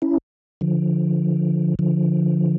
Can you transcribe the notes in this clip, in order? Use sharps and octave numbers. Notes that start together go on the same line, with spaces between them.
C#4 E4
D3 F3
D3 F3